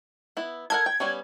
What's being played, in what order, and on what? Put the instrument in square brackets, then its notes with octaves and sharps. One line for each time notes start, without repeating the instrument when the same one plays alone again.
[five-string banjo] B3 E4
[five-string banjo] A4 A#4 F#5 [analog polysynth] G#6
[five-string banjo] G5
G3 B3 C#4